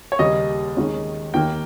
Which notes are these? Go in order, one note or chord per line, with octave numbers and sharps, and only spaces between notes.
C#5
D#2 C#3 G3 A#3 C#4 D#5
D#2 D#3 G#3 C#4
D#2 D#3 A#3 G5